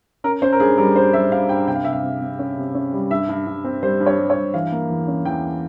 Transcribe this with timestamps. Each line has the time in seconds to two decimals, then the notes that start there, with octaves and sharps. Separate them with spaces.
0.24 C#4 A#4
0.42 C#4 C5
0.53 A#4
0.60 G2 G#4
0.78 G3 A#4
0.96 G2 C5
1.13 G3 E5
1.32 G2 F5
1.49 G2 G5
1.68 C3 G5
1.76 F5
1.84 C3 E5
1.93 F5
2.04 C3
2.21 C3
2.39 C#4
2.57 C3
2.75 C#4
2.93 G3
3.11 G2 E5
3.29 G2
3.47 G2
3.64 C4
3.83 G3 C5
4.00 G2
4.06 C#5
4.18 G3
4.30 C#5
4.36 G2
4.54 E3 F5
4.72 A#3
4.90 E2
5.08 C#4
5.25 E2 G5